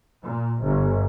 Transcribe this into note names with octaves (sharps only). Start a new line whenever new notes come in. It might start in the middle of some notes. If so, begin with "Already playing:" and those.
A#2
G1